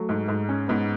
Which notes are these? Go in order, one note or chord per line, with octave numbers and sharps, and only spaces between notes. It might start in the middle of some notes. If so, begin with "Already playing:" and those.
Already playing: F#3 A3
G#2
G#2
C#4
G#2 B3